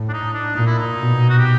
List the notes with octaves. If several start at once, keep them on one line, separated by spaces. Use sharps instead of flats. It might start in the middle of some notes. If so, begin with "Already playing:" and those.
Already playing: A2
D4
D#4
D4
A#2 D#4
E4
D#4
B2
F#4
G4